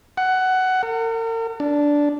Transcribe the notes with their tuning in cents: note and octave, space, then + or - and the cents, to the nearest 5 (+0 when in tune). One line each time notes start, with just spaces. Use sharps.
F#5 +15
A#4 -40
D4 -10